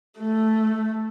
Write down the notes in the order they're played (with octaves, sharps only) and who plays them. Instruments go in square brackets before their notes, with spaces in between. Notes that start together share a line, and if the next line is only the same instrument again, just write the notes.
[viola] A3